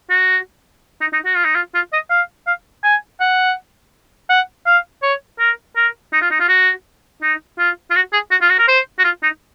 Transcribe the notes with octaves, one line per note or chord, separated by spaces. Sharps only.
F#4
D#4
D#4
F#4
F4
D#4
F4
F4
D#5
F5
F5
G#5
F#5
F#5
F5
C#5
A#4
A#4
D#4
F4
D#4
F4
F#4
D#4
F4
F4
F#4
G#4
F#4
F4
F#4
A#4
C5
F#4
F4
D#4